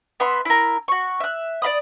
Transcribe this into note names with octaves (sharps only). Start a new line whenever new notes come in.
B3 E5 B5 C6
E4 A#4
F#4 C#6
E5 F#6
D5 F5 B5 D#6